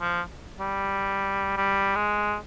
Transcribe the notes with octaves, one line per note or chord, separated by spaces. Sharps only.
F3
G3
G3
G#3